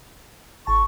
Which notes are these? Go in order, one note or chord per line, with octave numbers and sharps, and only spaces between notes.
G#1 A5 C#6